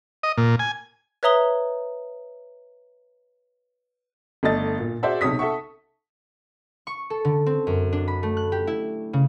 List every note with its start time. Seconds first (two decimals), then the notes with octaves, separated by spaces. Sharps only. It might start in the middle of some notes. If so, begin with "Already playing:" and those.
0.23 D#5
0.38 A#2
0.59 G#5
1.23 B4 C#5 E5 A#5 D#6 G7
4.43 G1 A3 D5 D#5 A6
4.79 A#2
5.03 F#4 G#4 C5 D5 E5 F#5
5.21 B1 C3 C#5 D#6 B6
5.39 A4 E5 F#5 C#6
6.87 C#6
7.10 A4
7.25 D3
7.46 C4
7.67 F#2
7.93 D4
8.08 B5
8.23 A3
8.37 F#6
8.52 G4
8.67 E4
9.13 C#3